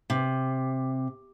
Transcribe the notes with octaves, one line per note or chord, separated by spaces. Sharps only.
C3